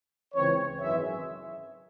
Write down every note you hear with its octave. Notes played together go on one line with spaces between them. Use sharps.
C#2 C#3 E3 C4 C#5
G#1 F#2 E3 G#3 E5